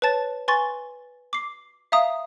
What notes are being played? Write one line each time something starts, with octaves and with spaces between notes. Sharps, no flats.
B4 C#5 A5 A6
B4 G#5 C6 C#6 A6
D6 C7
E5 F5 A#5 D#6